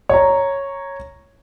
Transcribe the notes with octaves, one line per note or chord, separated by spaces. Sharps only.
C#5 A#5